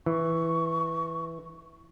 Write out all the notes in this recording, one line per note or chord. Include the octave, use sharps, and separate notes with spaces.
E3 C#6